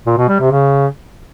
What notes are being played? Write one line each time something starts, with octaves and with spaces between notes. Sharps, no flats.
A#2
B2
G3
C3
C#3